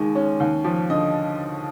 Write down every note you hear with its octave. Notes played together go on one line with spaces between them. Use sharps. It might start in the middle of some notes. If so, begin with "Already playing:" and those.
Already playing: D#2 D#3 G#3
C#4
D#2
F3
D3 D#5